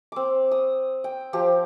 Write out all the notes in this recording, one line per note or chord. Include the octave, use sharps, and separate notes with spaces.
C4 D6
D#6
G5
F3 G4